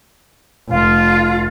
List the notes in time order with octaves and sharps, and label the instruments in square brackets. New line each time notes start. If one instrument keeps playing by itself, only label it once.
[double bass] F1 [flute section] F4